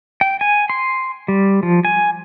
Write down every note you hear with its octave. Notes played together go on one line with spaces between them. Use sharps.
G5
G#5
C6
G3
F3
G#5